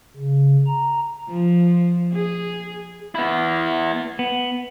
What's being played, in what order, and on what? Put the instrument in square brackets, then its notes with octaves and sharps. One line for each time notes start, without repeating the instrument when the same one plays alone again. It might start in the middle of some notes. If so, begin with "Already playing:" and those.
[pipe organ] C#3
A#5
[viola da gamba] F3
G#4
[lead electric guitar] B3 E4
[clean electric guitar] B3